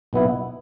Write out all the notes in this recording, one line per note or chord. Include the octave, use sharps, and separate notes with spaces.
B1 B2 B3 E4